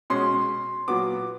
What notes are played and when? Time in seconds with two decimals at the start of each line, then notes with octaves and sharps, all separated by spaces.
0.10 B2 G#3 C#4 C6
0.88 A#2 F#3 B3 D6